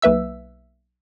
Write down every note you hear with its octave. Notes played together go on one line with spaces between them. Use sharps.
B1 A#3 B4 E5 E6